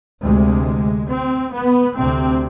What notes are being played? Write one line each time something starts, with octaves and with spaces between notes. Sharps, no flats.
D2 C3 G#3
C4
B3
D2 C3 C4